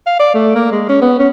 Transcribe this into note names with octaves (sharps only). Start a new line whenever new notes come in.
F5
D5
A3
A#3
G#3
C#4
B3
C#4